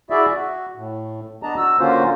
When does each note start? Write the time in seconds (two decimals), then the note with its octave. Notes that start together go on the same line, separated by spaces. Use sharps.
0.10 E4 F#4 G#4 D5 E5
0.36 F#4
0.76 A2
1.43 B3 D4 D#5 A5 A#5
1.57 F#4 E6
1.80 D3 A#3 C#4 F4 F#4 C5